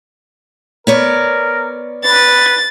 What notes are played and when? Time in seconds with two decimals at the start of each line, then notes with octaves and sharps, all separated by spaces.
0.87 B3 A#4 C#5 D5
2.04 B4 A6